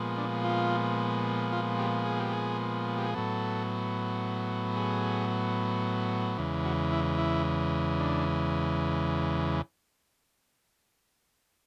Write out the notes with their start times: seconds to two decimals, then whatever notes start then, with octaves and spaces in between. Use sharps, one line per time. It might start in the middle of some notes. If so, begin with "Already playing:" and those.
Already playing: A#2 F3 G#3 B3
0.17 D4
0.44 F4
1.52 F4
1.79 G4
2.06 G#4
2.20 G4
2.33 G#4
2.98 G4
3.06 G#4
3.14 A2 F#3 B3 A4
4.77 G#4
6.38 E2 C#3 E3 G#3
6.65 F#4
6.92 E4
7.18 E4
8.00 D4